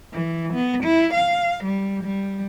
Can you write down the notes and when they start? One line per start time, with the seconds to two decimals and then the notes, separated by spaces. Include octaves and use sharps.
0.12 E3
0.54 B3
0.84 E4
1.14 F5
1.65 G3
2.04 G3